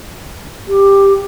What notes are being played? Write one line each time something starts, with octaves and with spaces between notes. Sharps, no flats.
G4